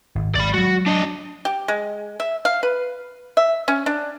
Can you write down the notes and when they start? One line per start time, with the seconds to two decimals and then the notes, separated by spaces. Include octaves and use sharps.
0.15 G#1
0.36 G#1 D5 B5
0.54 F#3 G#3 F#4
0.86 D4 D#5
1.45 G4
1.68 G#3
2.20 E5
2.45 F5
2.63 B4
3.37 E5
3.68 C#4
3.86 D4